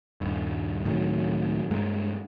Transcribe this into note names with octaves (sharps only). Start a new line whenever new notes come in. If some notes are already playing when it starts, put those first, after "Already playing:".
D#1 G2
C#2 A2 D#3 F#3
G2 G#3 A#3